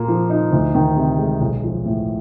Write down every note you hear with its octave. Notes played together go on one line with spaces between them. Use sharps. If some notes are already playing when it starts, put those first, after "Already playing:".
Already playing: A#2 A#3
F3
D#4
D2
D#3
C3
G#3
B1
F3
A2